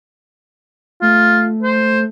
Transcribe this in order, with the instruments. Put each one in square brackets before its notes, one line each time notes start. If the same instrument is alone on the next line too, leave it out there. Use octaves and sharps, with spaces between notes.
[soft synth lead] A3 [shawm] F4
[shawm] C5